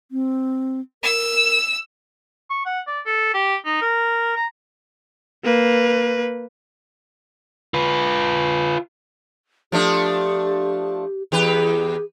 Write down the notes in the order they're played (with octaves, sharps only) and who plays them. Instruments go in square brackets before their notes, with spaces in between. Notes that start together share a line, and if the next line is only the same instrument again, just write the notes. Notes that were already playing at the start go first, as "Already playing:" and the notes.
[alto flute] C4
[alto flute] A#4 [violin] E6
[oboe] C#6
F#5
D5
A4
G4
D#4
A#4
A#5
[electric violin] A#3 B4
[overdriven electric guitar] F4 B4
[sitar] F3 A3 D4 [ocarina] G4
[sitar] E2 G4 B4 [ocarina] G#4